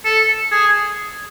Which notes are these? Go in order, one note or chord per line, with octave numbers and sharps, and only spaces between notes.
A4
G#4